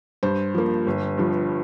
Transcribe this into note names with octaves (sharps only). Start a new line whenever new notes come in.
G2 C5
F3 A#3
G1
G2 F3